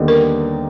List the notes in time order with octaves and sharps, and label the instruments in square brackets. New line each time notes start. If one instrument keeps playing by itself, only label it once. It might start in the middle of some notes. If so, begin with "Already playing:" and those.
Already playing: [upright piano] D#2 D3 G3 B3 D#4
[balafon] A#4